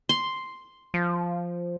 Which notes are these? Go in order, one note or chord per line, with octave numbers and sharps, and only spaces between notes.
C6
F3